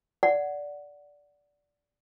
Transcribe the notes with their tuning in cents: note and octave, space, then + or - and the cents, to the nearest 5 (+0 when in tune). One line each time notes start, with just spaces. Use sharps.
D5 -10 F#5 +0